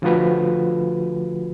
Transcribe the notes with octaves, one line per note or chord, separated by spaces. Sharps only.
D3 F3 A3 F4 F#4 B4